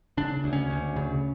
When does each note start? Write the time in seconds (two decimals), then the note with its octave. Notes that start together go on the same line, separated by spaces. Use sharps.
0.17 C#3 D4
0.44 D2
0.53 C#4
0.70 D2
0.96 C#3